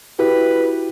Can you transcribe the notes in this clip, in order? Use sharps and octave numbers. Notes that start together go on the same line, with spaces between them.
E4 F#4 G4 B4